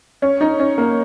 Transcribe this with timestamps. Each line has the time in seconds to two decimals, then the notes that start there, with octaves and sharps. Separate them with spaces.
0.22 C#4
0.41 D#4
0.59 C#4
0.78 A#3